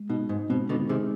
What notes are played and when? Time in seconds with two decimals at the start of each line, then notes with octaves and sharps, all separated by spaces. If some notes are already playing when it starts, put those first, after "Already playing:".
Already playing: G#3
0.10 B2 D#4
0.29 G#2
0.50 B2 C4
0.69 B2 D3
0.89 C3 D#3 G#4